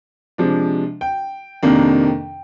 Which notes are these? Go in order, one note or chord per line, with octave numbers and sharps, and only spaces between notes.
C3 F3 G#3 D4
G5
F2 C3 D#3 A#3 D4